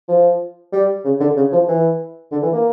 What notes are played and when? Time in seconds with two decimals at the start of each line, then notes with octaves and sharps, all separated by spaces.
0.08 F3
0.73 G3
1.04 C#3
1.20 D3
1.36 C#3
1.52 F3
1.68 E3
2.32 D3
2.42 E3
2.53 A#3